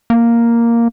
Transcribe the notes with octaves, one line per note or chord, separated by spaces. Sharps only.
A#3